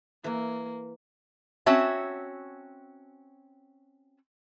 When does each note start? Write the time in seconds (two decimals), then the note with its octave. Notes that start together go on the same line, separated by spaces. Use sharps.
0.24 E3 A#3 A#4
1.66 C4 C#4 F#4 C#5 E5 A5